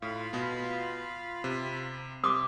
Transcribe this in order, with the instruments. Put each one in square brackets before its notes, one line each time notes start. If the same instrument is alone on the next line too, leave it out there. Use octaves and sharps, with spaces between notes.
[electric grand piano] A2 [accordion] F4 F5 B5
[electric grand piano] B2 B3
C3
[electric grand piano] C3 C6 [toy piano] D6 D#6